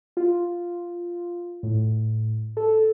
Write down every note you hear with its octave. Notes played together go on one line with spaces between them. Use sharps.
F4
A2
A4